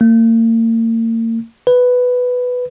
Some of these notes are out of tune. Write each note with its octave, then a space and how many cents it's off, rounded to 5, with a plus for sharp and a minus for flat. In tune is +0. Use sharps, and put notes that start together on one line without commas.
A#3 -40
B4 +5